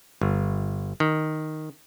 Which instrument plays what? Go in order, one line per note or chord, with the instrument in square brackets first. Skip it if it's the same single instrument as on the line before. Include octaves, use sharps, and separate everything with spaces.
[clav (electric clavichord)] G1
D#3